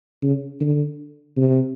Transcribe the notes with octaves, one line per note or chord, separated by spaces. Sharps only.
C#3
D3
C3